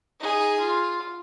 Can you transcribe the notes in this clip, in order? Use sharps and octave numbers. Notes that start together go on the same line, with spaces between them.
D#4 G#4
F4